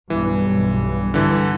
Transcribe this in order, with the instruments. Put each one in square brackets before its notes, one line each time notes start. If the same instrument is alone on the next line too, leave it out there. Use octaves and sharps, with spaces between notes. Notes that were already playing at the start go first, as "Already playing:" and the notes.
[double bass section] B1 G2 [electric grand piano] E3
[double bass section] G2 [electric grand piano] D3 E3